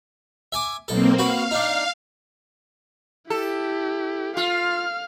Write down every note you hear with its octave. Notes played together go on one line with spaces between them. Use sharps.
E5 G#5 D6
B1 A#3 C4 A4
F#4 B4 F5
D4 D#4
E4 G4 A4
F4 F5 F6